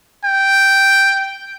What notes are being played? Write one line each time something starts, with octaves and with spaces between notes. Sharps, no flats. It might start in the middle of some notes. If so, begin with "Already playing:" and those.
G5